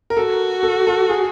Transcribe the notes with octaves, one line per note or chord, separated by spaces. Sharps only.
A#4
F#4 A4
A4
A4
G#4